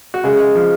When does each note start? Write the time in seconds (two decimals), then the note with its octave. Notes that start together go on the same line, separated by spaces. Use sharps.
0.14 F#4
0.24 C#3 G#3 G#4
0.40 G#3
0.55 F3